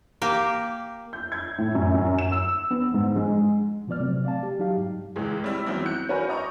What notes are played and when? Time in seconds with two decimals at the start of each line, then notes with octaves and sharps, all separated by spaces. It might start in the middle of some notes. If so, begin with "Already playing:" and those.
0.22 A#3 G4
1.13 G6
1.32 G#6
1.58 A2
1.75 F#2
1.94 F#2
2.18 E7
2.31 E6
2.71 B3
2.94 G#2
3.16 G#3
3.87 A#2 F3 B3 D5 F6
4.00 C3 F#3 A3 C4
4.25 D5 F5 A5
4.43 G4
4.59 F#3 D#4 G4 F5
4.77 G#2
5.16 C#2 E3 G#3
5.44 G3 C4 E4 F6
5.66 E3 F#3 B3 C4 D#4 E4
5.86 F#6 G6 C#7
6.09 C#4 D4 F#4 A#4 B4
6.28 D5 D#5 A#5 C#6